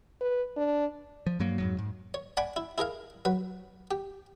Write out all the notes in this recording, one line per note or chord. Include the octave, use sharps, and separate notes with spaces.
B4
D4
F3
G2 F#3 A#3
F2 G#2 F#3
G#2
C#5
D5 F#5 G#5 B5 D6
E4
E4 G#4 A#4 F5
F#3 B4
G4